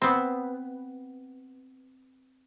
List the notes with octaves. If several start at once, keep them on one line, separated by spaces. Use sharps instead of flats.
B3 C4